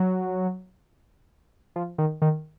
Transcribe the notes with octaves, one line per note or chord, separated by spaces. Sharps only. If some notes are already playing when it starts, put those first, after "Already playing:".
Already playing: F#3
F3
D#3
D#3